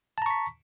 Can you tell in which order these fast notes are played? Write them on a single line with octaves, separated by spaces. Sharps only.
A5 A#5 C#6 B6